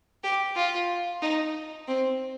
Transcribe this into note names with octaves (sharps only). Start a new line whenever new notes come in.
G4
F4
D#4
C4